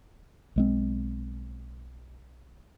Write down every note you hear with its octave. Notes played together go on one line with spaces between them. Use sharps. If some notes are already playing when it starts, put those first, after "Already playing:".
B1 G#3 C4